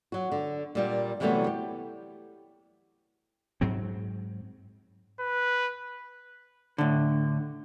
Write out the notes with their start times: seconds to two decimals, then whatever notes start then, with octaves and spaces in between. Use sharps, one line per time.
0.12 F#3 F#4
0.32 D3
0.75 A#2 G3 A#3
1.20 C3 E3 F#3 G3 A3 B3
1.47 G4
3.61 G#2 F#3 C4
5.20 B4
6.78 A2 D3